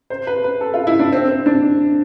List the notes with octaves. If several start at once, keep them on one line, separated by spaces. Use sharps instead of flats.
C5
B4
B4
A4
F4
E4
D4
C4
C4
D4